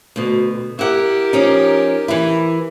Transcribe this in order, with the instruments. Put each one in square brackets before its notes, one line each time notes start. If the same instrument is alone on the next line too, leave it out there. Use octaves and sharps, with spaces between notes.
[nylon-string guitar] D2 B2
[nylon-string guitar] E4 F#5 [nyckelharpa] G4 A#4
[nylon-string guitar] F3 C#4 D#4
E3 E4